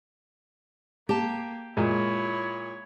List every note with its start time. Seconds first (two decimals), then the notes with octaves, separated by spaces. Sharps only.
1.09 A#3 G4 A5
1.77 A#2 G#3 E4 C#5